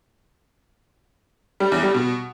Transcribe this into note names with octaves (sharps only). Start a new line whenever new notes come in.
G3
E2
G3
B2